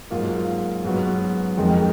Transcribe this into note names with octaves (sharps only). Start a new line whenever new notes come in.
G#2 F#3 A#3 F4
G#2 F#3 B3 F#4
F2 D#3 G#3 D#4